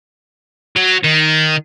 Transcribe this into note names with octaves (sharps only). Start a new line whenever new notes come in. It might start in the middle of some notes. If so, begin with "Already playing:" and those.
F#3
D#3